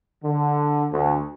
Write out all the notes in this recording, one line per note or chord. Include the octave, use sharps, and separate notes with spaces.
D3
D2